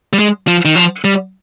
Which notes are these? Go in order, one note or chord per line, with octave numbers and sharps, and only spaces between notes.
G3
G#3
F3
D#3
F3
G3